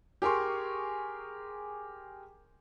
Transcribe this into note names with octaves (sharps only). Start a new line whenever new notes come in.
G4 G#4 A#4 G#5 C6 C#6